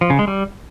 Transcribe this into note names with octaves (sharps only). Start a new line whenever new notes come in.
F3
C#3
G#3
G3